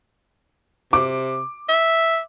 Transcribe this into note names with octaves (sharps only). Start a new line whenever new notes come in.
C3 D6
E5